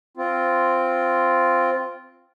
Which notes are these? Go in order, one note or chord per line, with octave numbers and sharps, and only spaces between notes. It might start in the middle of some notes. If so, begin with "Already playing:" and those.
C4 F4